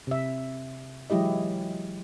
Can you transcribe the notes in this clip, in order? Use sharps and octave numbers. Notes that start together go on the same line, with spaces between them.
C3 E5
E3 F#3 G#3 E4 G4 D#5